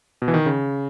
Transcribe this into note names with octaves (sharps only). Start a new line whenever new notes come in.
B2
E3
D#3
C#3